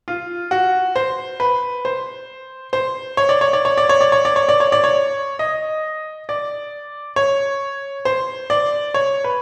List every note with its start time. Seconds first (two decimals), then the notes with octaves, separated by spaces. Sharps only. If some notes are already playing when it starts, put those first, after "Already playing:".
0.08 F4
0.51 F#4
0.96 C5
1.40 B4
1.85 C5
2.73 C5
3.17 C#5
3.29 D5
3.41 C#5
3.53 D5
3.65 C#5
3.78 D5
3.89 C#5
4.01 D5
4.12 C#5
4.25 D5
4.36 C#5
4.49 D5
4.60 C#5
4.72 D5
4.84 C#5
5.39 D#5
6.29 D5
7.16 C#5
8.05 C5
8.50 D5
8.94 C#5
9.24 B4